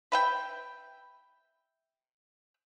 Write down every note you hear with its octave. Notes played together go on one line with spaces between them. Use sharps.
B4 E5 G5